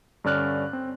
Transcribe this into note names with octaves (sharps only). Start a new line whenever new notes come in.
G2 D3 C#4 D5 F6 F#6
C4